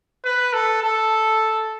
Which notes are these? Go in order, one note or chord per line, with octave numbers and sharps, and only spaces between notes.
B4
A4
A4